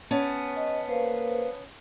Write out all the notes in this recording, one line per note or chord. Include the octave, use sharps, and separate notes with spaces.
B3 C#4 A5
D#5
A#3 B4 C5 F5